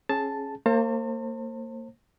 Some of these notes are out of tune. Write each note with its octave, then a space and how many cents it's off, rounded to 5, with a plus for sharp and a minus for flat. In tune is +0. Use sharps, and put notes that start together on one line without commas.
C#4 -20 G#4 +15 A5 +0
A#3 -30 C5 +30 A5 +45